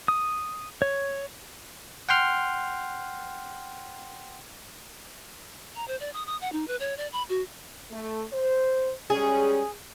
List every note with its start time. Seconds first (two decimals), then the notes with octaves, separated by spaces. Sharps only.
0.08 D#6
0.82 C#5
2.09 F#5 G5 C6 F6
5.75 A#5
5.88 C5
6.00 D5
6.14 D#6
6.27 D#6
6.41 F#5
6.52 D#4
6.68 B4
6.80 C#5
6.97 D5
7.13 B5
7.29 F#4
7.92 A3
8.33 C5
9.10 G3 G#3 C#4 G#4